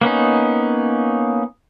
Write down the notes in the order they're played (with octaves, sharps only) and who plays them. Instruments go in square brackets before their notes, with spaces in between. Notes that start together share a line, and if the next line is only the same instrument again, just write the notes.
[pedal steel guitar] A#3 B3 C#4 D#4